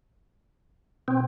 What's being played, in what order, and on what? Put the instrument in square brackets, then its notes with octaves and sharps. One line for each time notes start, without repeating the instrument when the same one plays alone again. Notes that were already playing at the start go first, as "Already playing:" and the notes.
[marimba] B2 [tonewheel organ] C4